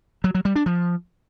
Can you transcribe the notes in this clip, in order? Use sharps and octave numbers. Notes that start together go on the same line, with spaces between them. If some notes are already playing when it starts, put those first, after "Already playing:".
F#3
F#3
G3
D4
F3